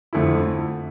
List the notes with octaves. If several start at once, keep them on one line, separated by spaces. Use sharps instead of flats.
F2 D3 A3 E4